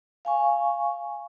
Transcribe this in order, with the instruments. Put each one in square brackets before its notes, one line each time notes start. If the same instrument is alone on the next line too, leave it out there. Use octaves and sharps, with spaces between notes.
[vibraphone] F5 G#5 C#6